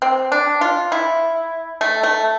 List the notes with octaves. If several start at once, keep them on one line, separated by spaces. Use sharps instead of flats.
C4
D4
F4
E4
A3
A3